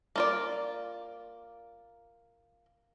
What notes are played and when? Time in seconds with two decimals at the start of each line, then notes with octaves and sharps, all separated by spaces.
0.16 A#3 F4 D5